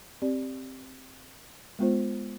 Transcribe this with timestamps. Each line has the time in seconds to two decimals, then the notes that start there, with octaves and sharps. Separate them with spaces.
0.22 C4 G4 D5
1.79 G#3 B3 F4 C5